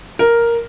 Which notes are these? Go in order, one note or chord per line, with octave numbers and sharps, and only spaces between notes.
A#4